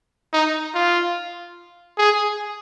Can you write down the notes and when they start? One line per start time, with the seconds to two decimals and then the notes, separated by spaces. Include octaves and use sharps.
0.33 D#4
0.74 F4
1.98 G#4